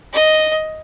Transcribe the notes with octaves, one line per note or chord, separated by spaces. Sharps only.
D#5